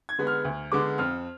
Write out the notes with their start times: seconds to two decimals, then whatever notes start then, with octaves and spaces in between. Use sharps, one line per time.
0.09 G#6
0.18 D3 G#3 B3
0.27 F6
0.45 D2
0.72 D3 G#3 B3 D6
0.98 F2 F6